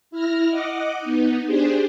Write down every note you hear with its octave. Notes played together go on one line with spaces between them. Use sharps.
E4 F6 A#6
D#5 F#5 D6
B3 D#4
D4 G4 G#4 C5